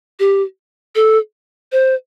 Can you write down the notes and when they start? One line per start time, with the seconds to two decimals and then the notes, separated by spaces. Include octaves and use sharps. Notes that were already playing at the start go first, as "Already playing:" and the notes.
0.20 G4
0.95 A4
1.72 C5